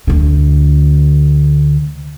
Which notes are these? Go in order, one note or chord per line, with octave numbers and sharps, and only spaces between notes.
D2 D3